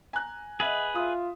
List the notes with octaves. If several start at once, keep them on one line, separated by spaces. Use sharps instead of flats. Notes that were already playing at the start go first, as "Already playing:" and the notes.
G#5 A#5 F#6
G#4 B4 D#5 E5 F#5
F4 E5 D#6